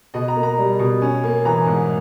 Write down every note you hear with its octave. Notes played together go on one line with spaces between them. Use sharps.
B2 D#5
A#5
A#3
A#5
G3
B2
C#4
A#3
E3 A#5
G#2